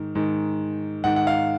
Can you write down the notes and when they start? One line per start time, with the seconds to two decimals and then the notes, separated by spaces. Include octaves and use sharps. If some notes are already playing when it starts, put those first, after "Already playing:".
Already playing: G#2 D#3
0.15 G#2 D#3
1.04 G#2 D#3 F#5
1.16 F#5
1.27 F5